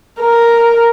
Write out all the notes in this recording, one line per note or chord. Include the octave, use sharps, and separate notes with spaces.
A#4